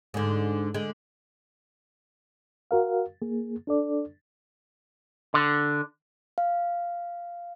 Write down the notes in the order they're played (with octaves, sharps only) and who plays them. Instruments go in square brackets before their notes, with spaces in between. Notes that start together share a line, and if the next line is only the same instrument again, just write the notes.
[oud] G#2 D3
D3 G#3
[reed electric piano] F#4 A#4 F5
A#3 G#4
D4 A4 D5
[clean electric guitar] D3
[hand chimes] F5